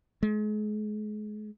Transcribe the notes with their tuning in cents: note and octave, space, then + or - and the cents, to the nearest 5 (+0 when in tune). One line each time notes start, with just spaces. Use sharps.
G#3 +35